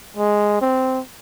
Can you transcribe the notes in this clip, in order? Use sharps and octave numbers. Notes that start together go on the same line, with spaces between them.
G#3
C4